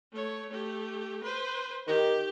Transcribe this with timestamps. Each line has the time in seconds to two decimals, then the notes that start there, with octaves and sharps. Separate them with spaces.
0.13 A3 C#5
0.49 A3 G4
1.23 B4 C5
1.87 D#3 G4